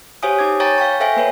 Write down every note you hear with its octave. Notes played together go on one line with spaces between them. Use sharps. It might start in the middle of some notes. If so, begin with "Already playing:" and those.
G4 C5 C#5 F5 G#5 D#6
D#4 D6 G#6
C#5 G5 G#5 A#5 C#6 A6
F5 G5 C#6
A4 C5 E5 F5 G5 G#5
A#3 B4 C#5